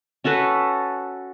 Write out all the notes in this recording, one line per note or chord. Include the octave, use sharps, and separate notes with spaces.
C#4 F#4 A4 B4